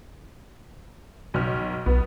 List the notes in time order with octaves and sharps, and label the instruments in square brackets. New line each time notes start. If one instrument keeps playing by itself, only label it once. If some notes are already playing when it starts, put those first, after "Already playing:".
[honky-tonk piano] B1 F6
[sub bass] B1 [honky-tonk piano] B3